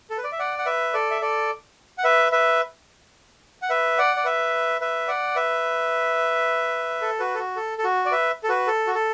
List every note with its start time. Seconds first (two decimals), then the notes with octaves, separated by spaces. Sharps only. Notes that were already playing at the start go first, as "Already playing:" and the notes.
0.10 A4
0.18 B4
0.24 D5
0.32 E5
0.39 D5 F#5
0.58 F#5
0.66 B4 E5
0.93 A4 D5
1.11 E5
1.22 A4 D5
1.98 F#5
2.04 B4 E5
2.32 B4 E5
3.62 F#5
3.69 B4 E5
3.98 D5 F#5
4.16 D5
4.25 B4 E5
4.81 B4 E5
5.08 D5 F#5
5.36 B4 E5
7.01 A4
7.20 F#4 B4
7.35 A4
7.39 F#4
7.56 A4
7.78 A4
7.84 F#4
8.05 D5
8.11 B4 E5
8.43 A4
8.49 F#4 B4
8.67 A4
8.87 F#4
8.95 A4